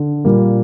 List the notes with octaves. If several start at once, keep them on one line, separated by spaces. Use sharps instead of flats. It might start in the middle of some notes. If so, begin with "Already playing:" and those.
Already playing: D3
A#2 G3 A#3